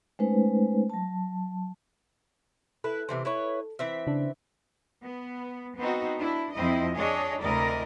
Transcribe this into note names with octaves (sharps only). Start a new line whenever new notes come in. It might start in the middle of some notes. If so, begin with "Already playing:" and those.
G#3 A3 C#4 D#4 B4 C5
F#3 A5
E4 A4 B4
C3 E3 C5
E4 B4 C#5
E3 C4 E5
C#3 D4
B3
B3 C4 D#4 F#4
D4 E4
F2 F3 C4 E4 D#5
D4 G#4 C#5 D#5
D2 C3 E4 A#4 D5 D#5